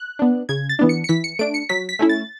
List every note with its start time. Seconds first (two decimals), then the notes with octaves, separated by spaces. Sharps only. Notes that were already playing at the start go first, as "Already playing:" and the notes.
Already playing: F#6
0.19 B3 D4
0.49 C#3 G#6
0.69 A6
0.79 E3 B3 D4
0.89 C#7
1.04 C#7
1.09 E3 B6
1.24 C#7
1.39 A3 D4 D7
1.54 C#7
1.69 F#3 B6
1.89 B6
1.99 A3 C#4 E4
2.09 A6